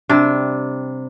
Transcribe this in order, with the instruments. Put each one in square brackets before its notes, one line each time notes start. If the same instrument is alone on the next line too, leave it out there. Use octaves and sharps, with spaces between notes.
[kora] C3 G3 D4